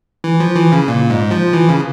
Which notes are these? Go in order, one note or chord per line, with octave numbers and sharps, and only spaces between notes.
E3
F3
E3
C#3
A#2
G#2
F3
E3
C#3